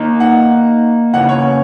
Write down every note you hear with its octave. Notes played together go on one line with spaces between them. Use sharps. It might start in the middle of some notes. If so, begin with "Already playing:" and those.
Already playing: D#3 A#3 D#4
F#5
C#3 E3 A#3 C#4 F#5
C#5